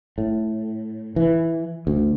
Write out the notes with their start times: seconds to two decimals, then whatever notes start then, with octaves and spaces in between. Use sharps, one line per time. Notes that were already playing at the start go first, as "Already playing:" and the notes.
0.18 A2
1.16 E3
1.87 D2